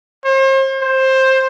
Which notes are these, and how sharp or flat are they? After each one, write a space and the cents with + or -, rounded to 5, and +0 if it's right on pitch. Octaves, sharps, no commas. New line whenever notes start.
C5 +40
C5 +15